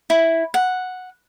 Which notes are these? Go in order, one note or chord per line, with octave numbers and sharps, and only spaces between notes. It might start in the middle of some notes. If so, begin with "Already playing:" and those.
E4
F#5